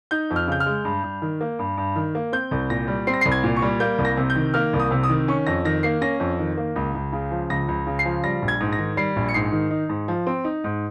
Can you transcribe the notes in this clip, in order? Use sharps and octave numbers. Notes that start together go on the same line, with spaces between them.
D#4 G6
F2
F6
C#3 G6
F6
G#3
G2
G2
D#3
A#3
G2
G2
D#3
A#3
C4 G6
C2
A#2 A#6
G3
C4 C7
A#6
C7
C2
G#6
A#2
C#6
G3
A#3 G6
C2
A#6
C3
G6
D#3
A#3 F6
C2
D#6
C3
D#6
D#3
C#4 C#6
F2 A#6
D#3 A#6
A#3 C7
C#4 A#6
F2
D#3
A#3
C#2
C#2
C#3
F3
C#2 A#6
C#2
C#3
C7
F3
G3 A#6
A#1
G#6
G#2
A#6
D#3
G3 C7
A#1
C#7
G#2 C7
D#3
D#4
G#2
F3
C4
D#4
G#2